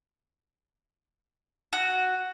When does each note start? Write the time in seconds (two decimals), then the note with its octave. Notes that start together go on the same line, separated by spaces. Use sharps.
1.73 F#4